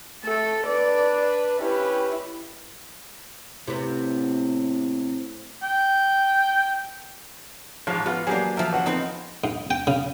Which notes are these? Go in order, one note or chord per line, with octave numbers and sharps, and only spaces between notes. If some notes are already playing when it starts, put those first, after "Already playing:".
A3 A4
D4 B4 D5
C#4 E4 G4 B4
A2 C3 B3
G5
A1 G#2 F3
B3 F4
F#3 A#3 D4 G4 G#4
F3 A#4 E5
C#2 F#5
B3 C4 D#4
G#2
G5
C#3